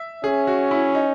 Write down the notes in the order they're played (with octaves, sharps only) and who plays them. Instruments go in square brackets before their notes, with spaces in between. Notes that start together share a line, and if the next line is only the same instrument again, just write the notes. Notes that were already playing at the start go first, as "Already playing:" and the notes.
Already playing: [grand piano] E5
[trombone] C#4 [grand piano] G#4
[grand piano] F#4
E4
D#4